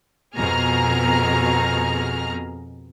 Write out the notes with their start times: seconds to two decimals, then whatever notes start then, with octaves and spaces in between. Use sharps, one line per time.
0.36 F2 B2 G#4 A#5 F6